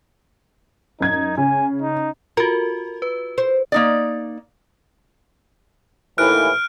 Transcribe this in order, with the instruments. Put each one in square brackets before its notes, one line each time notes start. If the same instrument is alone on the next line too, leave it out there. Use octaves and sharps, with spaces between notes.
[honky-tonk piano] F#2 G#6 [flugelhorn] D#4
[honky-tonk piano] C#3 [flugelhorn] G#5
[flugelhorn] D#4
[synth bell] F4 F#4 [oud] A#4
[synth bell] B4
[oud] C5
[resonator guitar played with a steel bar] A#3 D#4 D5
[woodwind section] D#2 A2 E3 [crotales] F6 F#6 D7